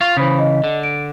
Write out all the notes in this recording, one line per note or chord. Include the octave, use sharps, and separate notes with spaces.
F4 F5 C#6
C#3 E3 C5 B5 D#6
D#5
D3
D7